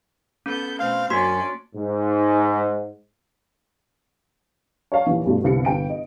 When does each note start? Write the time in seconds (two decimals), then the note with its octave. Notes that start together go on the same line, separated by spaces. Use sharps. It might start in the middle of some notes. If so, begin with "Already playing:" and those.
0.46 B3 C#4 A4 G6
0.80 B2 A3 C4 F5
1.10 F#2 A#3 C#4 D4 F#4 D5 C6
1.76 G#2
4.92 C#5 D5 F5 A5
5.07 D#2 A#2 E3
5.26 G2 B2 A3 D4 F4
5.43 G1 C2 G4 C#7
5.65 G1 G5 D7
5.89 D#5